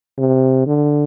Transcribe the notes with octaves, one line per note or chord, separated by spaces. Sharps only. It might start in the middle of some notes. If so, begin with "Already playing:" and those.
C3
D3